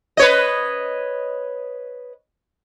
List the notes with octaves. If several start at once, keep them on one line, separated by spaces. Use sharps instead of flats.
B4 C#5 D#5